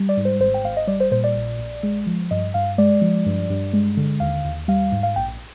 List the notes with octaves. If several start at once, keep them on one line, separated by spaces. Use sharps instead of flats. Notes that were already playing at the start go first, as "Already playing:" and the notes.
Already playing: G3
D5
G#2
C5
G#1 C5
G5
G#1 F5
D#5
G3 D5
C5
A#2 C5
D5
A#1
A#1
G#3
F3
G2 D#5
G2 F5
G#3 D5
F3
G2
G2
G#3
D3
D#2 F5
D#2
G3 F5
G#2
F5
A#1 G5